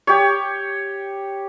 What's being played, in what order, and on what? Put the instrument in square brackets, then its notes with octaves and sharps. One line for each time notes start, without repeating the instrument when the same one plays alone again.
[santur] G4 C#5